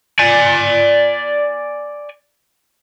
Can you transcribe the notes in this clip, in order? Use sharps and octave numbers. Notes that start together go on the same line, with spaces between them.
D5 G#5